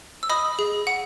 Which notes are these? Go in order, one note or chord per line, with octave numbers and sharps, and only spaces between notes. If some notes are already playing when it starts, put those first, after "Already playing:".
E6
D#5 B5 D#6
G#4
F#5